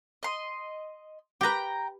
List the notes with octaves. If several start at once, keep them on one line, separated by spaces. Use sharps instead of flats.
D#5 C6
G4 B4 G5 A#5